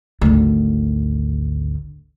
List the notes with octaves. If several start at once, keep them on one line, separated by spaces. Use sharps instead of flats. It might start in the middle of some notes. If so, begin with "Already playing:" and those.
G#1 D2